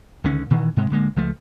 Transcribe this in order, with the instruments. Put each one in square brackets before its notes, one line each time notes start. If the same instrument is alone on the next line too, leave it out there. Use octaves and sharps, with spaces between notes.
[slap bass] C#2 D3 D#3 C#4
A#2 D#3 E3
G#2 C3 G#3
D1 D3 G#3 A#3
C#2 F3 A3